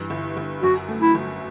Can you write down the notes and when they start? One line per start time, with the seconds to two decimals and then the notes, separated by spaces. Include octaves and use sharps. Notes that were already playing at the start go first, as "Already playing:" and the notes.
Already playing: G2 E3
0.10 G1
0.37 G1
0.62 F#2 F#4
0.88 A3
1.01 E4
1.15 G1